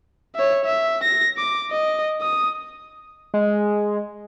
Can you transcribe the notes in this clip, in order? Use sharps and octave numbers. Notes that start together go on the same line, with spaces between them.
C#5 E5
E5
A#6
D6
D#5
D#6
G#3